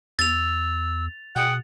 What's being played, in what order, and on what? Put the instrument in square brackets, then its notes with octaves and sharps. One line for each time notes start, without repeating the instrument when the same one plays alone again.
[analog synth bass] E2 [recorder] E6 [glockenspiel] A6 F7
[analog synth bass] B2 [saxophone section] G#4 F#5 [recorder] G5